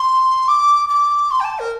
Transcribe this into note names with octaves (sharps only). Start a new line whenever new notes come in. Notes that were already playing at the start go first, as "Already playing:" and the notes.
Already playing: C6
D6
D6
C6
G5
A5
A#4